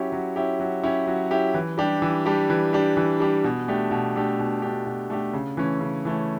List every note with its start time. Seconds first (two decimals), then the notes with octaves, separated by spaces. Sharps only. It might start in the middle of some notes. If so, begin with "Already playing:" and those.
Already playing: F#3 C#4 E4 G4
0.12 F#3
0.36 C#4 E4 G4
0.60 F#3
0.83 C#4 E4 G4
1.07 F#3
1.31 C#4 E4 G4
1.54 E3
1.78 G3 D4 G4
2.02 E3
2.26 G3 D4 G4
2.50 E3
2.73 G3 D4 G4
2.97 E3
3.20 G3 D4 G4
3.44 B2
3.68 A3 D4 G4
3.91 B2
4.16 A3 D4 G4
4.39 B2
4.62 A3 D4 G4
4.86 B2
5.10 A3 D4 G4
5.33 C#3
5.57 E3 A3 C#4
5.81 C#3
6.05 E3 A3 C#4